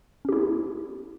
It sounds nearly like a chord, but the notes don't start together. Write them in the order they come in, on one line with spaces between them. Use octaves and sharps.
C#4 G4 E4 B3